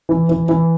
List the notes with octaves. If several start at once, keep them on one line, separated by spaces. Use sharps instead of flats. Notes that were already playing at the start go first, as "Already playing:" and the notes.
E3
E3
E3